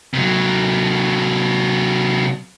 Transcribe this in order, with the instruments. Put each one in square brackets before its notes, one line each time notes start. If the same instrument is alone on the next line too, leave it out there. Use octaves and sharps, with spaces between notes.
[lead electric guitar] C3 F#3